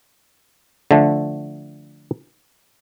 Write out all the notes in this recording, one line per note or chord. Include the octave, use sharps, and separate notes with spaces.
D3 F3 A3